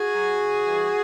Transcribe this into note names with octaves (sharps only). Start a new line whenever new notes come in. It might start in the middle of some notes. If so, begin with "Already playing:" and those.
Already playing: F#4 G#4
F#3
C#3
E3 G3